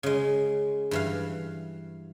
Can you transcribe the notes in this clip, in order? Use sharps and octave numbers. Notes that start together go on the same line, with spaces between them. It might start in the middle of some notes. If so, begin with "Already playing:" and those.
C#3 G#3
G2 E3 F5